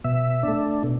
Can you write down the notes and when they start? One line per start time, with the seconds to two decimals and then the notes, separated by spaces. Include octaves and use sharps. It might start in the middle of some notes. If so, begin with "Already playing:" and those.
0.04 B2 E5
0.43 A3 D4
0.83 B2